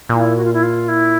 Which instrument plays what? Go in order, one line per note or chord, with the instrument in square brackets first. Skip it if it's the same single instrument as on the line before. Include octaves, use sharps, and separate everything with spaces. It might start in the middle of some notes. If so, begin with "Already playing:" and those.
[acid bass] A#2 [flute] E4
[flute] F#4
F4
E4
F4
E4